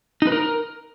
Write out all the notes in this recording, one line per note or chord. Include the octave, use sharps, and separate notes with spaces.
D#4
B4
A#4